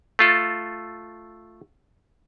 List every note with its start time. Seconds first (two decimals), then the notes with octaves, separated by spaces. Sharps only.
0.19 A3 F4 A4